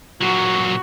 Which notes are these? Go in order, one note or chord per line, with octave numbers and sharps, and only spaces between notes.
A#2 F#3 F#4